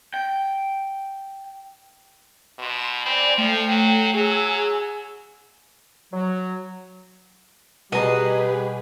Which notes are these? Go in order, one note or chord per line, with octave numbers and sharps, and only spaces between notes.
G5
B2 C6 E7
C4 D5 G#5 B5
F3 A3 G5 C7
F#3
F#3 G#4 G#5 E6
F#3
B2 G3 G4 G#4 B4 D#5 A#5